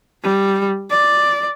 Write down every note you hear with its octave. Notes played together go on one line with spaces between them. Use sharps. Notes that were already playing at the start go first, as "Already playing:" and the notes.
G3
D5